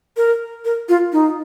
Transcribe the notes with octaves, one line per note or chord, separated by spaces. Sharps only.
A#4
A#4
F4
D#4